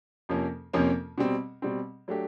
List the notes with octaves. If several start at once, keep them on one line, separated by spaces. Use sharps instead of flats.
F2 C3 F3 A#3 C#4
F2 C3 F3 A#3 C#4
B2 G3 C4
B2 G3 C4
F#3 A3 D4 G4